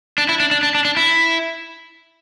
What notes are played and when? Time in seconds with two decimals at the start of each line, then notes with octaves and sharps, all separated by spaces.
0.18 D4
0.29 E4
0.40 D4
0.51 D4
0.63 D4
0.75 D4
0.85 D4
0.97 E4